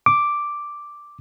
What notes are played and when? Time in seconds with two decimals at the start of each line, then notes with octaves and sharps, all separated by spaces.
0.06 D6